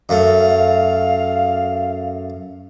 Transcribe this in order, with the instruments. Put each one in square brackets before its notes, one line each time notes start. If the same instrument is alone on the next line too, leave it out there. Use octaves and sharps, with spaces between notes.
[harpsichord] F#2 A3 [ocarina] F5